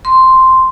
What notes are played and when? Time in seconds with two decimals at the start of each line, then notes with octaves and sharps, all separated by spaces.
0.05 C6